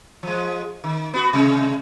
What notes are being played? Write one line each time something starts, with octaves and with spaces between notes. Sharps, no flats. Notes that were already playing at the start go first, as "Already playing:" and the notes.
F3 G#3
D#3
B3 F#4
C3 G#3